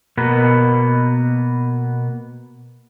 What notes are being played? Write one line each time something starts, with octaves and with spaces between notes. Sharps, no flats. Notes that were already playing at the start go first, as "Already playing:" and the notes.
B2 A#3 B3 F#4